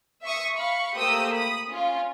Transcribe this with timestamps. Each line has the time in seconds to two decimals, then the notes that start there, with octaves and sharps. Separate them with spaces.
0.23 E5 C#6 D#6
0.57 F5 B5 C#6
0.95 A3 A#3 G4 C5 D#6 E6
1.33 B5 D#6
1.68 C#4 F4